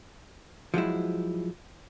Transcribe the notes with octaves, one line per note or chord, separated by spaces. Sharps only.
F3 F#3 G#3 E4